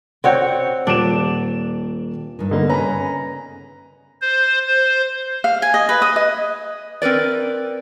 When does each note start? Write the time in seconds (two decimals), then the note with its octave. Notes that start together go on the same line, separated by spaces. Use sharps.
0.24 C4 F#4 C#5 D5 F#5 G6
0.87 D#1 D4 D7 E7
2.39 G2 D#3
2.51 D3 A#3 B3 D#4
2.70 C#3 C#4 B4 G#5 A#5 B5
4.21 C5
4.68 C5
5.44 F5
5.62 G#5
5.74 D#5
5.89 B4
6.02 D#6
6.16 D#5
7.02 C4 A#4 B4 D5